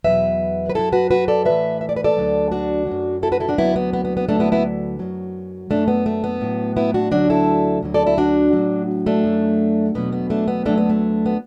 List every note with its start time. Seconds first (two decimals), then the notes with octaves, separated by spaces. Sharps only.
0.04 E2 B2 F#3 B4 E5
0.70 B4
0.75 F#2 F#3 E4 A4
0.93 F#4 B4
1.11 F#4 B4
1.28 A4 D5
1.45 A2 E3 B4 E5
1.81 E5
1.89 D5
1.96 B4
2.04 A4 D5
2.17 D2 D3 F#3
2.51 D4 F#4
2.87 F#2 F#3
3.23 E4 A4
3.32 F#4 B4
3.40 E4 A4
3.49 D4 F#4
3.58 D2 D3 F#3 B3 E4
3.76 B3
3.93 B3
4.05 B3
4.17 B3
4.29 D2 D3 F#3 A3 D4
4.40 B3 E4
4.52 B3 E4
4.99 F#2 F#3
5.70 F#2 F#3 A3 D4
5.88 B3
6.06 A3
6.24 B3
6.41 A2 F#3
6.77 B3 E4
6.94 D4 F#4
7.12 D2 D3 F#3 D4 F#4
7.30 E4 A4
7.82 D2 D3 F#3
7.94 A4 D5
8.06 E4 A4
8.18 D4 F#4
8.53 A2 F#3
9.06 A3 D4
9.24 F#2 F#3
9.95 E2 B2 F#3 B3
10.12 B3
10.30 A3 D4
10.48 B3
10.66 D2 D3 F#3 A3 D4
10.78 B3
10.89 A3
11.26 B3